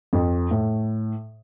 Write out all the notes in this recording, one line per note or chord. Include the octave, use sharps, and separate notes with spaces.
F2
A2